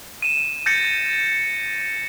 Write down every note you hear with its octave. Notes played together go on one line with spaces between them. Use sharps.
D#7 E7
G6 A6 A#6 C#7